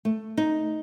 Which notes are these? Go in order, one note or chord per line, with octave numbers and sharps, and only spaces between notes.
A3
D#4